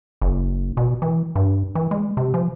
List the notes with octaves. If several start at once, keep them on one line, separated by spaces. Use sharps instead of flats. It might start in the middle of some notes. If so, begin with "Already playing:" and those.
F#1
B2
E3
G2
E3
G#3
C3
F3